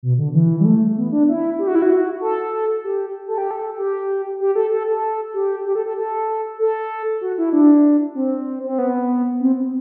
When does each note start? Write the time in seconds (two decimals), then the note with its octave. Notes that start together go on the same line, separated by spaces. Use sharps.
0.03 B2
0.18 D3
0.34 E3
0.60 G3
0.65 A3
0.97 B3
1.12 D4
1.28 E4
1.59 G4
1.67 F#4
1.75 E4
1.82 F#4
2.21 A4
2.84 G4
3.27 A4
3.38 G4
3.51 A4
3.78 G4
4.40 G4
4.55 A4
4.72 A4
4.88 A4
5.34 G4
5.65 G4
5.75 A4
5.86 A4
5.97 A4
6.59 A4
7.21 F#4
7.38 E4
7.53 D4
8.15 C4
8.66 C4
8.79 B3
9.41 C4